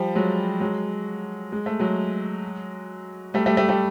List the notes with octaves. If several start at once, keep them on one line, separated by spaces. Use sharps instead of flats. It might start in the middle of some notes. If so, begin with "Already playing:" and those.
Already playing: F3 G3
F#3 G#3
F#3 G#3
G#3
A3
F#3 G#3
G3 A3
G3 A3
G3 A3
G3 A3